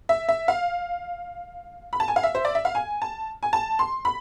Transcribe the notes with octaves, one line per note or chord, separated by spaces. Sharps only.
E5
E5
F5
B5
A5
G#5
F5
E5
C5
D5
E5
F5
G#5
A5
G#5
A5
C6
B5